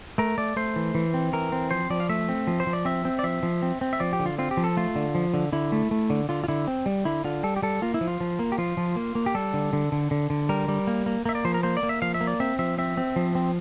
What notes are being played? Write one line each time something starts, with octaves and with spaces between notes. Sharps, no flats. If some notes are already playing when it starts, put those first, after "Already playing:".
A3 A#4
A3 D5
A3 C5
E3
E3
C4
E3 A#4
C4
F3 C5
F3 D5
F5
A3 E5
C4
F3
C5
F3
D5
C4 E5
C4
D5
F3 E5
F3
C4
C4
E5
F3 D5
G4
D3
F4
C4 F4
G4
F3
A4
A3 F4
D3
F3
D3
D3 E4
A3
A3
D3
D3 F4
F4
D3 E4
C4
G3
D3 E4
D3 F4
G3 A4
G4
G3 A4
A#3 F4
E4
F3
F4
F3
A#3
G4
F3 F4
F3
A#3
A#3
G4
G3 A4
D3
D3
D3
D3
D3
G3 A#4
G3
A#3
A#3
A#3 E5
D5
F3 C5
A#4
A#3 C5
D5
A#3
E5
F3 F5
E5
A#3
D5
C4 E5
F3 E5
C4 E5
C4
F3
C4